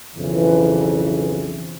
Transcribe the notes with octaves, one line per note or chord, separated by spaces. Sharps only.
B1 F2 C#3 E3